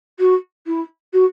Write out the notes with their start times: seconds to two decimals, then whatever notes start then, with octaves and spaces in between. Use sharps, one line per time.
0.19 F#4
0.66 E4
1.13 F#4